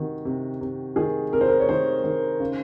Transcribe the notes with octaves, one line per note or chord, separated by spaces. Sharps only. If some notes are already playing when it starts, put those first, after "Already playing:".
Already playing: C3 D#3 F#4
C3
C3
D#3 G#4
C3 A#4
C5
A#4
C#5
D#3 C5
D#3
C#3